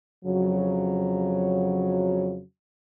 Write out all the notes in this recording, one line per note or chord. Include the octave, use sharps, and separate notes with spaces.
F2 C#3 F#3